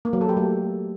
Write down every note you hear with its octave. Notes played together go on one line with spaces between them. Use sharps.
A#3
F#3
A4
G4
A3